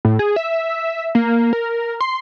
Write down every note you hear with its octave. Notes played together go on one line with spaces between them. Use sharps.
A2
G#4
E5
A#3
A#4
C6